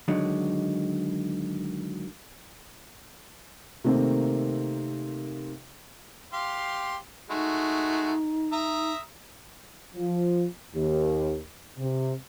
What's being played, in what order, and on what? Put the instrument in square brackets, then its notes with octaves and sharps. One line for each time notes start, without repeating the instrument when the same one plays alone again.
[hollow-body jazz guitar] D3 D#3 F#3 G#3
[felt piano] C3 D#3 A3 A#3 C4
[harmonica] G4 F5 C6
[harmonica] G#3 A3 F#4 [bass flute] D#4
[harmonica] E5 A#5 D#6
[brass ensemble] F3
D#2
C3